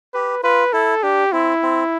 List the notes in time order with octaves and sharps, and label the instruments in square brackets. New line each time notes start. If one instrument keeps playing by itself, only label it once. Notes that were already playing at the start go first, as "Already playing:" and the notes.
[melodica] G4 [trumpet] B4
[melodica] F4 [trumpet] B4
[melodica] E4 [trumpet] A4
[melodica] D4 [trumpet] G4
[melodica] C4 [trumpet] E4
[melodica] C4